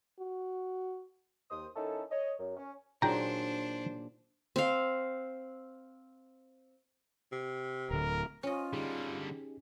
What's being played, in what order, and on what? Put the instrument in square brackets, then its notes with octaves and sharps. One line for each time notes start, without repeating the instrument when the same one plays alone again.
[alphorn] F#4
[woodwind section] D#2 C5 D#6
D#3 C#4 D#4 E4 A4
C#5 D#5
F#2
C#4
[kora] A#2 F#3 [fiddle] D4 C5 [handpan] D#4 G#4 [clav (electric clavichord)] G5 A#5
[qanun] C4 F5
[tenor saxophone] C3
[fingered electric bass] D1 D3 [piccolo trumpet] A#4
[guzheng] C#4 D#5 [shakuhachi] F4
[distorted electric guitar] D3 G3 [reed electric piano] D#4 G4 G#4